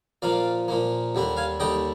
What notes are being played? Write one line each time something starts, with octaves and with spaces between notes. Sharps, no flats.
A#2 F3 A#3 D5 F5
A#2 F3 A#3
D#2 D3 G3 D4
F5 G#5
D#2 D3 G3 D4 D#5 G5